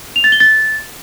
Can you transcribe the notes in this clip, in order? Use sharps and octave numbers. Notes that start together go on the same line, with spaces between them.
F7
A6
G7
A6